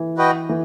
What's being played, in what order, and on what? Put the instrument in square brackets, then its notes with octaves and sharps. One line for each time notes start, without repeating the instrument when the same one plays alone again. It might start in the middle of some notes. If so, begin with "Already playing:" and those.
Already playing: [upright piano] E3
[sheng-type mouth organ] F#4 B4 D#5 G5
[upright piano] E3